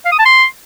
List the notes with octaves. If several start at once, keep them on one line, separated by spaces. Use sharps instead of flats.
F5
D#6
A5
C6